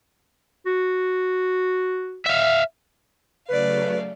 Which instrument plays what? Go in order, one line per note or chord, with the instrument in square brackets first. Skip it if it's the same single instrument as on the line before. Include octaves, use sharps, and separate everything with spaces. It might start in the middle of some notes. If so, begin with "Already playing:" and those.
[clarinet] F#4
[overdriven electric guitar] E5 F5
[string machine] C#3 F#3 A3 [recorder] B4 [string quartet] D5 F5